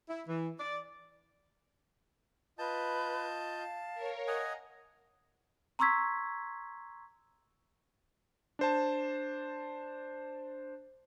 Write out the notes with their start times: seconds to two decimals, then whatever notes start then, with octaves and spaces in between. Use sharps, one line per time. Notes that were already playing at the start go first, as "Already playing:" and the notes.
0.09 E4
0.27 E3
0.59 D5
2.59 F4 B4 D#5 A5 G6
3.57 F5
3.94 A#4 C#5
4.27 D#5 F#5 G#5 A#5
5.79 A#5 C6 C#6 E6 G#6 B6
8.59 D4 C5 A5